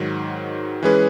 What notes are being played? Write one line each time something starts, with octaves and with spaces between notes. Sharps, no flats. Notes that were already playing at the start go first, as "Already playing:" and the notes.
Already playing: G#2 D#3 F#3
E3 G#3 C#4 G#4 B4